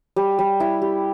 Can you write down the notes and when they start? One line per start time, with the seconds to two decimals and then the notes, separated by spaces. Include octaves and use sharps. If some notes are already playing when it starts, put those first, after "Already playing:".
0.16 G3
0.39 G3
0.60 E4
0.82 G4